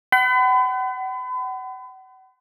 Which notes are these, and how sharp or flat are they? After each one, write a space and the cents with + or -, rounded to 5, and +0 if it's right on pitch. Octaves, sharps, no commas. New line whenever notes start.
F#5 +40 B5 +40